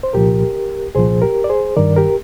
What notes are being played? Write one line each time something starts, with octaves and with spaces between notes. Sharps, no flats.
C5
C2 A#2 F3 G4 A#4
C2 A#2 F3 G#4 C5
G4 A#4
D5
G#4 C5
G2 D#3 A#4 D5
G4 A#4